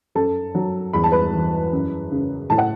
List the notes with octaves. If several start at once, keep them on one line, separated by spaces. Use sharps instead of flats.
F#2 A4 A5
F#3
E2 B5
A5
B4 B5
E3
F#2
C#3
A2 A5
F#5